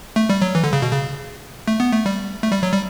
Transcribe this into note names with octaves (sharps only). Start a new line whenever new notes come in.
A3
G3
F#3
E3
D3
C#3
B2
C#3
A3
B3
A3
G3
A3
G3
F#3
G3